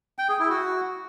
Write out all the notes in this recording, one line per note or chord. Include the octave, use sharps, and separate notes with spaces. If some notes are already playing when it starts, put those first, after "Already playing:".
G5
G#4
E4
F#4